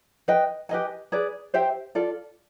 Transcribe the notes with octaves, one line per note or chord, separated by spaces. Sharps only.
B4 D#5 G5
G4 B4 D#5 G#5
G#4 B4 D5
G4 C5 E5 G5
F4 A4 D5